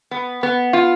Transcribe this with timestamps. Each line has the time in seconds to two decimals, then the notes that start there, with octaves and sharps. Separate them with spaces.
0.11 B3
0.43 B3
0.73 F4